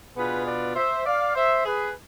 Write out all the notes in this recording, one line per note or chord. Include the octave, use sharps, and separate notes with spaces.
B2 B3 D4 F4 G#4 B4
B4 D5
C5 E5
D5 F5
C5 E5
G#4 B4